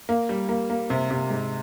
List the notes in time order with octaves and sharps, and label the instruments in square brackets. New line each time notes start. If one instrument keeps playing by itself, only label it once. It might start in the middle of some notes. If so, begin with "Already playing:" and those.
[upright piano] A#3
G3
A#3
A#3
C3
C3
G#2